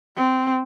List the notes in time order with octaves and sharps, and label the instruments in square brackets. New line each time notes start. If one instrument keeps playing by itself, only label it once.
[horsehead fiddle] C4